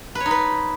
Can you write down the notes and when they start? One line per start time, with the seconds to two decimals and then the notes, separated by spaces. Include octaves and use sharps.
0.15 B4
0.20 C#5
0.26 D#4
0.31 B4